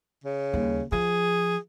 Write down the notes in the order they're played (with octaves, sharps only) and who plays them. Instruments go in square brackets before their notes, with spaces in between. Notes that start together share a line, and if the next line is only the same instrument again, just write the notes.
[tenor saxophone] C#3
[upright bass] D#2 G3
[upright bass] F3 [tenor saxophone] G#4